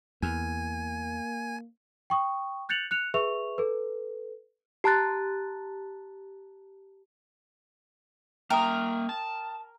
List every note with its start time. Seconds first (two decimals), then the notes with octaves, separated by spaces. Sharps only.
0.22 E2 A#3 G#5
2.10 G5 C#6 D#6
2.69 F#6 G6 A6 C#7 F7 F#7
2.91 F#6 C#7 F7
3.14 G#4 B4 E5 C#6 F7
3.58 A4 B4
4.84 G4 A5 A#5 F#6 A6
8.50 A#3 A#4 E5 G5 D#6
9.09 A5